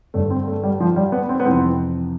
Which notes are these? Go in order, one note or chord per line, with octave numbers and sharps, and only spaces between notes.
G2 D3 A3
C4
A3
G3
F3
G3
B3
C4
B3
F2 C3 E3 C4